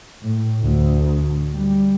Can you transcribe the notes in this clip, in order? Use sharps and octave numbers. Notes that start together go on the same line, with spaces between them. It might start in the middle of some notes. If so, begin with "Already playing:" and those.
A2
D2
G3